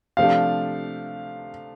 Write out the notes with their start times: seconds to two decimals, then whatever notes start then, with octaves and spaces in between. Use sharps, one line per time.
0.17 C3 F3 A3 D4 G4 F5